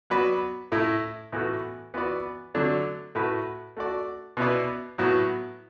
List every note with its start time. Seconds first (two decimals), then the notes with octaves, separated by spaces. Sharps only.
0.10 F#3 B3 F#4 B4 D5
0.72 A2 A3 E4
1.32 A2 E3 B3 F#4 A4
1.94 E3 B3 F#4 B4 D5
2.54 D3 F#3 A3 D4
3.15 A2 A3 F#4 B4
3.77 A3 F#4 D5
4.37 B2 B3 E4 B4 D5
4.98 A2 F#3 B3 F#4